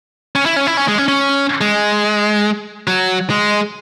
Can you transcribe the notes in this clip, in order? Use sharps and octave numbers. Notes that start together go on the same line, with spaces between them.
C#4
E4
C#4
E4
C#4
G#3
C#4
C#4
G#3
F#3
G#3